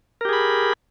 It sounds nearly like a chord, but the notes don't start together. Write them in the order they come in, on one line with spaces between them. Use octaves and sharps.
A#4 G4 G#4 B5